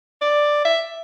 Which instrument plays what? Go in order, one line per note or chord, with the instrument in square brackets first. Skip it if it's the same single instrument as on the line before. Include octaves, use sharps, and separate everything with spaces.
[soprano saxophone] D5
E5